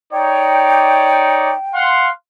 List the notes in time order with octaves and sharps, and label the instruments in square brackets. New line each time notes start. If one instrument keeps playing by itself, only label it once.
[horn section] D#4 C#5 D5 [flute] G5
[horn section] F5 F#5 C6